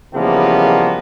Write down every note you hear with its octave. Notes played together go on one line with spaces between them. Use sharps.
C#3 E3 F3 G3 A#3 B3